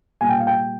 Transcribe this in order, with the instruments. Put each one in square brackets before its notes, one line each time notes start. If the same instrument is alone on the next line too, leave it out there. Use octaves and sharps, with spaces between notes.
[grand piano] A#2 G3 A#3 F4 [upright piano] G#5
[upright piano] G5
F5
G5